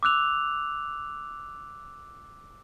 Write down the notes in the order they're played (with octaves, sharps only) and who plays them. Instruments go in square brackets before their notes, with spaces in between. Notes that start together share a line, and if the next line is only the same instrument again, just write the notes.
[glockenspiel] D6 E6 F#6 F7